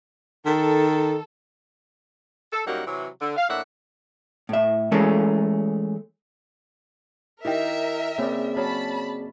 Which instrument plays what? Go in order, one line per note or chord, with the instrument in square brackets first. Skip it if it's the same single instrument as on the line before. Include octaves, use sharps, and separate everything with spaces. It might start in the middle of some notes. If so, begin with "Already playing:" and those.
[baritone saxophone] D#3 [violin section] A4
[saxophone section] A4
F#2 F#3 G3 A#3 D#4 F#5
C3 E3 F#3
D3
F5
A2 A#3 D4 E5 F#5
[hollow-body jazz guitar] A2 E5
E3 G#3 A3 C#4 A4 A#4
[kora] D#3 G4 [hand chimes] E4 D#5 G5 [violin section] A#4 E5
[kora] C#3 [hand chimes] A#3 [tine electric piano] C4 G#4 D5
[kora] F#3 C#4 D#5 [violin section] A5 B5